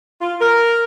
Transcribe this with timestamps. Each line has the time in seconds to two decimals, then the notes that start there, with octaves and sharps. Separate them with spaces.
0.21 F4
0.41 A#4